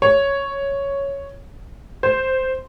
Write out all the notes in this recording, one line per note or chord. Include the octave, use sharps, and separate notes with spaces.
C#5
C5